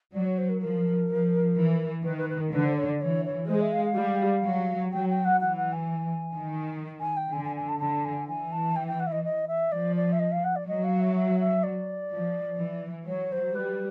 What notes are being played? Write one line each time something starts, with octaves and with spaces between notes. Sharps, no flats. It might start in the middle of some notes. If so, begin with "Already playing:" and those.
F#3 D5
C#5
C5
A#4
F3 A#4
F3
E3
D#3 B4
B4
B4
A#4
D3 B4
C5
C#5
D5
E3 C#5
C#5
G#3 C5
E5
F5
F5
G3
F#3
F#3 G5
G5
F#5
E3 F#5
F#5
G#5
D#3
G#5
G5
D3 G#5
G#5
G#5
A5
D3 A5
G#5
E3 G#5
A5
G5
G5
F#5
E5
D#5
D#5
E5
F3 D5
D5
E5
D#5
F5
F#5
D5
F#3 D#5
F5
E5
E5
E5
D5
F3
E3
F#3 C#5
C5
G3 B4